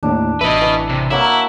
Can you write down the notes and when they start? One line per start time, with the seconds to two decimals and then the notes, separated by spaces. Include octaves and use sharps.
0.03 D#2 A2 D4
0.41 A1 B4 D#5 E5
0.61 E3
0.89 C3
1.10 F#3 A#3 E4 F#4